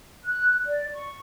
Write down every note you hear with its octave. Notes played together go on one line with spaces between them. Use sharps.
F#6
D5
C#6